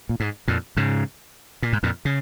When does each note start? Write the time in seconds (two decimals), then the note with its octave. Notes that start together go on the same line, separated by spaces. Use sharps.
0.09 A#2
0.20 G#2
0.48 F2 A#2
0.77 G#2 C#3
1.62 A#2
1.73 G#2
1.83 F2 A#2
2.05 C#3